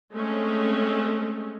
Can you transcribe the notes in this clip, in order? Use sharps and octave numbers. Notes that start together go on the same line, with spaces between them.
G#3 A3 C4 C#4 A4